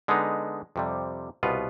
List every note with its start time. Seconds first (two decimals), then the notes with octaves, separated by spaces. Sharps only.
0.08 D3 G#3 B3 D#4
0.76 F2 C3 G3
1.43 C2 B2 B3 F4 B4